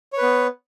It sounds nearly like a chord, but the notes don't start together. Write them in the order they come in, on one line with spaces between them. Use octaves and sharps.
C#5 B4 B3